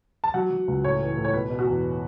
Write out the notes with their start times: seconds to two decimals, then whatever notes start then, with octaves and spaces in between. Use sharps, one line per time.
0.24 A5
0.34 F#3 F#5
0.51 F#3
0.68 C#2
0.84 A2 C#5
1.00 E3
1.17 A2
1.25 C#5
1.33 B2 B4
1.50 B2
1.59 F#4
1.67 E2